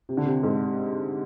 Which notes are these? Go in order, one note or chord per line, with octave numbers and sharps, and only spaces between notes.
C3
D3
C3
G#2